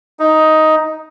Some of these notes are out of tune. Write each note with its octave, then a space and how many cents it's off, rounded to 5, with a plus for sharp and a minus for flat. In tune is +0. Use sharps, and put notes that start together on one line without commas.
D#4 +10